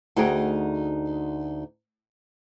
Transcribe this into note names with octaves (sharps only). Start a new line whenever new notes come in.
D2 D#4 F#4 G#4 G5